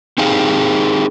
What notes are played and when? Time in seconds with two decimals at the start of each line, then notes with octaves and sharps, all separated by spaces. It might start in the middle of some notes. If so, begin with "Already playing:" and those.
0.18 C4 D#4 G4 G#4 F5